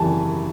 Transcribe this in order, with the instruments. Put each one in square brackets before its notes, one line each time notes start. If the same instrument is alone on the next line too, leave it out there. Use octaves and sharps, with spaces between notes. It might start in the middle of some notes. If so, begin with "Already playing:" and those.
Already playing: [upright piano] G#1 F#2 C#3 E3 G3 G#5 A5